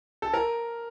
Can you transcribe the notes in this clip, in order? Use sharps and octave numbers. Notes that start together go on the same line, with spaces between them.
A4
A#4